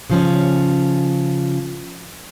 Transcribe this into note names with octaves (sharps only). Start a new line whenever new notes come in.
C#3 F3 C#4